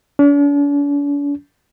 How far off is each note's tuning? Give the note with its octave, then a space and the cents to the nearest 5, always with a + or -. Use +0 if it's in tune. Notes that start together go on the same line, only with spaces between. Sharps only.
D4 -45